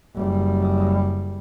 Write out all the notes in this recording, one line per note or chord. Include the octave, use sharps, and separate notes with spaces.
F#1 G3